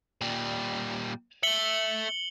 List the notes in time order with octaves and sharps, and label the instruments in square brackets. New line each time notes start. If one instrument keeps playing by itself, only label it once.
[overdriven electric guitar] A#2 G3
[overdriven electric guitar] A3 E5 [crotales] C#7 F#7 G7